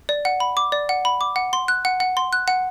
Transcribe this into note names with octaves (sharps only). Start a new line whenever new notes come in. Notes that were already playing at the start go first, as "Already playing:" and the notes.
D5
F#5
B5
D6
D5
F#5
B5
D6
F#5
C6
F#6
F#5
F#5
C6
F#6
F#5